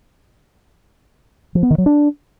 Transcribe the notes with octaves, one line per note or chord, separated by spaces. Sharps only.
F3
B3
D#3
F#3
D4